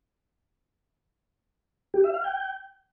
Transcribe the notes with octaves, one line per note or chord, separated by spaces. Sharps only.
G4
E5
F5
G5